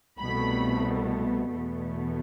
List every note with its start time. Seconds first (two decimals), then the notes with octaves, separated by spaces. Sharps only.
0.19 C2 B2 A3 B5
1.50 E2 B2 A3